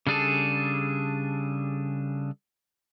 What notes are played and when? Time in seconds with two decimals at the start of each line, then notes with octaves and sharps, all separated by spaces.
0.07 C#3 G3 D4 G#4 A4